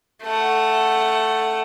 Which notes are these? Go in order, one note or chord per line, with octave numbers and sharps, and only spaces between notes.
A3 F#5